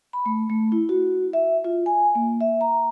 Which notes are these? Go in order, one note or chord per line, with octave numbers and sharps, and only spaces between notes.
B5
A3
A3
E4
F#4
E5
F4
G#5
A#3
E5
A#5